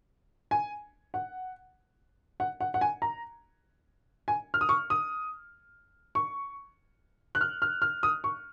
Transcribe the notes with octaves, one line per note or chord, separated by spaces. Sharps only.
G#5
F#5
F#5
F#5
F#5
G#5
A#5
G#5
F6
D#6
C#6
D#6
C#6
F#6
F6
F6
F6
D#6
C#6